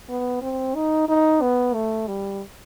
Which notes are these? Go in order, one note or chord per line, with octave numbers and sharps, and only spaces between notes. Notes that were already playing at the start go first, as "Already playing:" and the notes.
B3
C4
D#4
D#4
B3
A3
G3